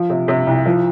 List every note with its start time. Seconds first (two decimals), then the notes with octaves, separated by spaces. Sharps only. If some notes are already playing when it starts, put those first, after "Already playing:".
Already playing: F3
0.10 C3
0.28 C3
0.47 C2
0.66 F3